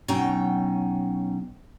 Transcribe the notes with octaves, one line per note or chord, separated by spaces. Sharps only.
B2 F#3 C#4 D#4 G5